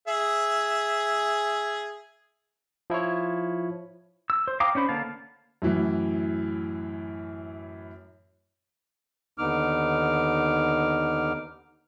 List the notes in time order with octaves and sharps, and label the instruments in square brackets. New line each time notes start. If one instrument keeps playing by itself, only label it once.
[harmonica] G#4 E5
[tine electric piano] F3 E4 F4 C#5
[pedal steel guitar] E6
C5
F5 G5 A#5 D6 D#6
C#4 D4 C5 B5
D3 A#3 F5 A5
[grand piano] F#2 A2 E3 F#3
[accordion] D#2 D3 B3 D#4 D6 F6